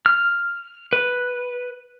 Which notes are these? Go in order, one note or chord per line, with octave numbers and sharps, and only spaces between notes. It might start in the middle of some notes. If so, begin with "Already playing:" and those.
F6
B4